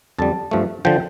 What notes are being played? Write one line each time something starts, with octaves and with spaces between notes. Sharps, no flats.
F2 D3 G3 A5
G2 F3 A3
D3 F3 G5